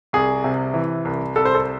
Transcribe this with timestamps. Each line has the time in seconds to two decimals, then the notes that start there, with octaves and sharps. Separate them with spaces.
0.13 C2 G#4
0.44 C3
0.74 E3
1.05 C2
1.36 C2 A4
1.45 C5
1.55 A4